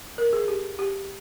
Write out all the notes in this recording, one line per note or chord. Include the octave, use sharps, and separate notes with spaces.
A#4
G#4
G4
G4